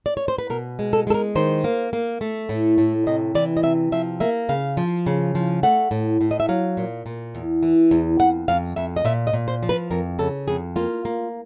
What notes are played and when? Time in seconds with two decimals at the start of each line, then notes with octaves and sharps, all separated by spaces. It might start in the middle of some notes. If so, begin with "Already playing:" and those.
0.06 D5
0.17 C#5
0.28 C5
0.38 B4
0.50 B2 A#4
0.79 G#3
0.93 A4
1.07 G#3 A4
1.14 A#4
1.35 D#3 C5
1.64 A#3
1.93 A#3
2.21 A3
2.49 A2
2.78 A2
3.07 C3 D#5
3.35 E3 D5
3.57 D#5
3.63 C3 E5
3.92 F3 E5
4.20 A#3 E5
4.49 C#3 F5
4.77 F3
5.06 C#3
5.35 F3
5.63 A3 F#5
5.91 A2
6.21 A2
6.31 D#5
6.40 E5
6.49 F#3 F5
6.77 A#2
7.06 A#2
7.35 E2
7.63 E3
7.91 E2
8.19 F2 F#5
8.48 F2 F5
8.76 F2 E5
8.96 D#5
9.05 A#2 E5
9.27 D#5
9.33 A#2
9.48 C5
9.63 F3
9.69 B4
9.91 F2 A#4
10.19 C#3 A4
10.48 F2 G#4
10.76 A#3 F4
11.05 A#3